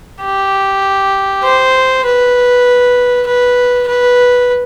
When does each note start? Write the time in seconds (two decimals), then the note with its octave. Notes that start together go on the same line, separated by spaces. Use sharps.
0.21 G4
1.43 C5
2.05 B4
3.26 B4
3.88 B4